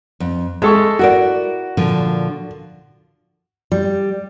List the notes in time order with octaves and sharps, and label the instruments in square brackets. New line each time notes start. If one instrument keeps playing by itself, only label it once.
[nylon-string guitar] F2
[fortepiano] G#3 A4 C#6 [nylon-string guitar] E5
[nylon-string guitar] E4 A#4 D5 [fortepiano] F#4
[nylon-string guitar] A#2 D3 F3
[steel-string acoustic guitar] G3